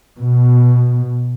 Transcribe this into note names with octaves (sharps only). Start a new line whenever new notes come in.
B2